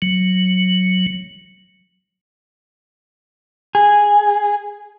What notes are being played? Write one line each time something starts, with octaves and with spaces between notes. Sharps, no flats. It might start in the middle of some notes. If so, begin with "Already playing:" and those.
F#3
G#4